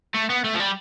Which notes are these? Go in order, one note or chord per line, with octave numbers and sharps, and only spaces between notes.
A3
B3
A3
F3
G3